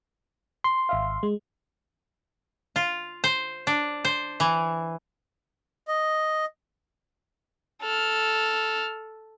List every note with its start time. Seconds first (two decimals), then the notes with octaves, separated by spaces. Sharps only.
0.64 C6
0.89 G#1 E5 F5
1.23 G#3
2.76 F4
3.24 C5
3.67 D4
4.05 C5
4.40 E3
5.88 D#5
7.82 A4 F6